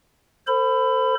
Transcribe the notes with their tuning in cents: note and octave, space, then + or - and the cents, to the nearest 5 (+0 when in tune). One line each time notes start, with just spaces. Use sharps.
A4 +40 C5 +0 B5 +20